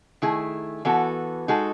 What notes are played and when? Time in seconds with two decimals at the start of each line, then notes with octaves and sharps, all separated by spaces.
0.22 D#3 A3 E4 G#4
0.85 E3 B3 F#4 A4
1.48 G#3 D#4 F#4 A4